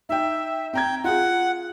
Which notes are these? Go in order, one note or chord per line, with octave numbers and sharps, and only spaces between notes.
D#4 E5 G5
C4 G5 A#5 G#6
F4 G#4 F#5